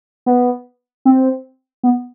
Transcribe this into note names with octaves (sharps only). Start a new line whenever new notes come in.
B3
C4
B3